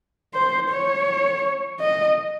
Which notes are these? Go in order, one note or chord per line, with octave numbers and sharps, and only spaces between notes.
C5
C#5
D#5